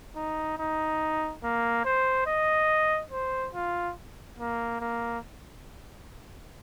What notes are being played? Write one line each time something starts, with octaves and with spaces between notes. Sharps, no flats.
D#4
D#4
A#3
C5
D#5
C5
F4
A#3
A#3